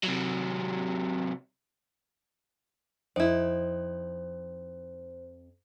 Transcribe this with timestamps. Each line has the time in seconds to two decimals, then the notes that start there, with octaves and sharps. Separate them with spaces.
0.03 C3 F#3
3.16 F2 D#4 E4 C5